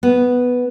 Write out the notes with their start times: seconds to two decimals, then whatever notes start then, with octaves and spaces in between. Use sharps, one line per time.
0.03 B3